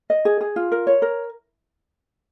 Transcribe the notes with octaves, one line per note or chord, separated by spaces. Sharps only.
D#5
G#4
G#4
F4
A#4
C#5
A#4